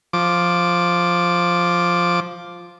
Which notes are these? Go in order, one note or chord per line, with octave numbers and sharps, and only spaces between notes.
F3 D6